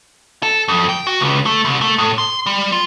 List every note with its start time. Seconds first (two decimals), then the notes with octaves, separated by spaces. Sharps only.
0.43 A4
0.68 F2
0.89 G5
1.07 F#4
1.20 C#2
1.46 A3
1.65 C2
1.81 A3
1.98 A2
2.18 C6
2.46 G3
2.72 F4